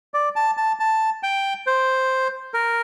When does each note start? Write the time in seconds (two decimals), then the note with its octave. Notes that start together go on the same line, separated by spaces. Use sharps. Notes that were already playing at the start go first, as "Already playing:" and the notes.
0.14 D5
0.36 A5
0.57 A5
0.80 A5
1.23 G5
1.67 C5
2.54 A#4